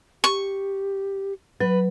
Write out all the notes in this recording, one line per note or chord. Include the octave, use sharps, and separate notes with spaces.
G4 C#6
F#3 B4